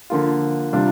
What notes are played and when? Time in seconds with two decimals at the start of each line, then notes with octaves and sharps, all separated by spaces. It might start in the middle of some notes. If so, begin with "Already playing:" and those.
0.10 D3 F3 A#3 F4
0.73 C3 G3 D4 F4